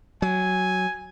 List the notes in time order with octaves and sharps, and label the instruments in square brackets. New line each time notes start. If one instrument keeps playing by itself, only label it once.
[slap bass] F#3 [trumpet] G#5